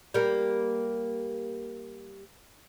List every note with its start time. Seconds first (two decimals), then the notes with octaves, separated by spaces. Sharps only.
0.14 G3 A#3